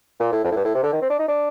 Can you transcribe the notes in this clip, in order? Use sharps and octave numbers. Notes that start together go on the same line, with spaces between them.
A#2
A2
F2
A2
G2
A2
C3
D3
D#3
C4
D4
D#4
D4